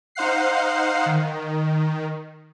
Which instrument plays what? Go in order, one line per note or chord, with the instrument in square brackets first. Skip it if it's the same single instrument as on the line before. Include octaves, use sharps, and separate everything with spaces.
[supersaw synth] D#4 C5 F5 F#5 C7
D#3